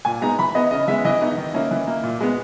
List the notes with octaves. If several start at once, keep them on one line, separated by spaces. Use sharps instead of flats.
A#2 G#5
G#3 B3 D#4 A#5
E3 B5
B3 E4 D#5
C#3 D#5
E3 G#3 B3 E5
E3 D#5
B3 D#4
D#3
A#3 C#4 E4
E3
A#3 E4
A#2
G#3 B3